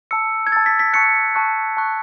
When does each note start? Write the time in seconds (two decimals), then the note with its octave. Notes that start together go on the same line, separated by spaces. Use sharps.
0.11 A5 E6 C#7
0.47 G#6
0.52 A5 E6 A6
0.66 B6
0.79 B6
0.93 A5 C#6 F#6 C#7
1.35 A5 C#6 F#6
1.77 A5 C#6 F#6